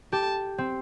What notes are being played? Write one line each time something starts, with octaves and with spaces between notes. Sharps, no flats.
G4 A5
C4